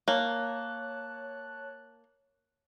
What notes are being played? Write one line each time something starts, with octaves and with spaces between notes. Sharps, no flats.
A#3 C#5 A5 F#6